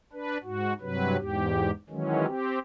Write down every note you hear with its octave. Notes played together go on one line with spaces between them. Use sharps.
D4 B4
G#2 F#4
G2 C3 F#3 B4
E2 G#2 G4
D#3 E3 F#3 G#3 C#4
C4 G4